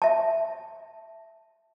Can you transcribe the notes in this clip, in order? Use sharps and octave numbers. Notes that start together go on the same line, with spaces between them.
E5 A5